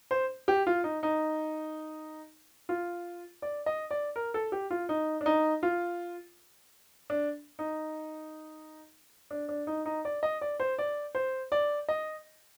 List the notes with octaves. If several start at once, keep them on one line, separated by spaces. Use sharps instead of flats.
C5
G4
F4
D#4
D#4
F4
D5
D#5
D5
A#4
A4
G4
F4
D#4
D4
D#4
F4
D4
D#4
D4
D4
D#4
D#4
D5
D#5
D5
C5
D5
C5
D5
D#5